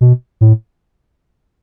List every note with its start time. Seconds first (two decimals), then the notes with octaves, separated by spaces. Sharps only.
0.01 B2
0.41 A2